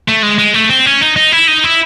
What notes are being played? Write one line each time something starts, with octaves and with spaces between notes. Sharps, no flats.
A3
G#3
G#3
A3
C4
C#4
D#4
D#4
E4
D#4
E4